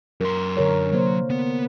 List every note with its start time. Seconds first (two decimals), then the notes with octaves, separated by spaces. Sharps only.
0.21 F#2 A#4 C6
0.57 D3 A#4 C#5
0.92 C3 F#3 A#3 C5
1.30 B3